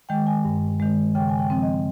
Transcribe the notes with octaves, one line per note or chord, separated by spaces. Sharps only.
D#3 G#3 G5
G#5
G2
D#3 G#3
C#3 G5
G#5
G5
F3 C4
D#5